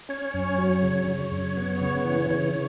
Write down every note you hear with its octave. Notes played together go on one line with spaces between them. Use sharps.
C#4 C#5
F#2
F#3
C#3
C#3
F#2
B3
C#3
E3
C#3 C#5